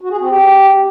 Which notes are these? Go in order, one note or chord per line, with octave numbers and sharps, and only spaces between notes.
F#4
G#4
C4
G4